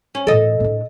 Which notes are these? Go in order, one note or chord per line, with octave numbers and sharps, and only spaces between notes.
C#4
A2 E3 A4 D#5
A2 D4